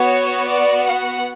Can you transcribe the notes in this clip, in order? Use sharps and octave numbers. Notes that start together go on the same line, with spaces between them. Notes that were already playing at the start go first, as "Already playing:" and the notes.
Already playing: B3 F#4 C#5
D5
F#5